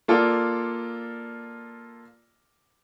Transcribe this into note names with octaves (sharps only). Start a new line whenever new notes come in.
A#3 F4 A4 D5 F5